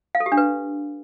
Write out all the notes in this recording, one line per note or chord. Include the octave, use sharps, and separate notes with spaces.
F5
A4
G4
D4
B4